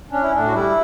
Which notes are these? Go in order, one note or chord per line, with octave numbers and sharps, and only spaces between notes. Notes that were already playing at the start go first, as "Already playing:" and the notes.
C#4 D4
E4
A2 D4
F#4
G3 E4